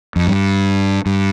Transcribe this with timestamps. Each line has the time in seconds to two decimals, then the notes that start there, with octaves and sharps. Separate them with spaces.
0.16 F2
0.27 G2
1.06 G2